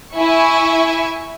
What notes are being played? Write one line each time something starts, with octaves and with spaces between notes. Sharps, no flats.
E4 E5 G#5 C#6